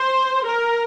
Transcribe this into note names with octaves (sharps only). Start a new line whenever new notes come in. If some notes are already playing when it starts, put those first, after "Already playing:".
Already playing: C5
A#4